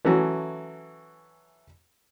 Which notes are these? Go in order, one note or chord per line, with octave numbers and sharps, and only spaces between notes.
E3 F#3 A3 C#4 F#4